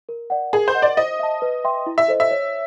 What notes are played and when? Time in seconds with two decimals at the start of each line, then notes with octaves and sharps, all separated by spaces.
0.09 A#4
0.30 D5 F#5
0.53 G#4 A#4
0.68 C5
0.75 D#5 F#5
0.82 D5
0.97 C5 D#5
1.19 E5 A5
1.42 B4
1.64 E5 G5 C6
1.86 E4
1.98 E5
2.08 A4 C5 D#5
2.20 E5
2.31 C#5